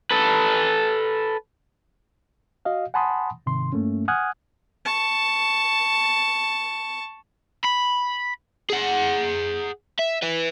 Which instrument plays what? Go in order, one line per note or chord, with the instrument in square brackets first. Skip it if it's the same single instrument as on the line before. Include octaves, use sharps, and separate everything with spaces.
[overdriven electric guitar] A4 B4
[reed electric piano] F#4 D#5 F5
F#5 G#5 A5 B5 C6 D#6
G#2 C3 D#3 C6
G2 A3 A#3 C#4
F#5 G#5 D#6 F6 F#6 G#6
[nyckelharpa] A5 C#6
[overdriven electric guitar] B5
G#4 F#5
E5
B4 E5